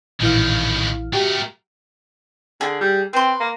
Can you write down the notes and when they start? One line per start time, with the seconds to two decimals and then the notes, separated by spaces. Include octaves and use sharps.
0.21 A#1 A2 D#3 E3 F5
1.13 A3 F#4 G4 A#4
2.61 D3 G#4
2.81 G3
3.13 C4 B4 C6
3.40 A#3